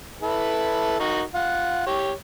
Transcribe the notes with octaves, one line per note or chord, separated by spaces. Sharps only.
E4 A4 B4
D#4 F#4 A#4
F4 F#5
G4 C#5